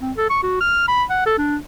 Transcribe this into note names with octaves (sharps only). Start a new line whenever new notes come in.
C4
A4
C#6
F#4
F6
B5
F#5
A4
D4